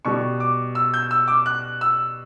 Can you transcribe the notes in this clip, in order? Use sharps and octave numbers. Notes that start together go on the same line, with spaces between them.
B2 G3 C#6
D6
E6
G6
E6
D6
F#6
E6